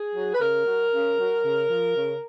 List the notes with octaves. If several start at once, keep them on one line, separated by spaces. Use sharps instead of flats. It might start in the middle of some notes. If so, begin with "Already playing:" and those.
Already playing: G#4
F#3
B4
C#3 A#4
F#3
C#3
F#3
C#3
F3
C#3